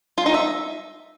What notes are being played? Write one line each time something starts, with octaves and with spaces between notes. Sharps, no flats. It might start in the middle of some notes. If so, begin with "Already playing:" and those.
F4
D#4
E5